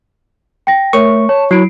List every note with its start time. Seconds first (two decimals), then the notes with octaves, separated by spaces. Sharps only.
0.67 G5 A#6
0.93 A3 A#4 C#5 C#6
1.29 C#5 A5
1.51 F#3 E4 C7 D7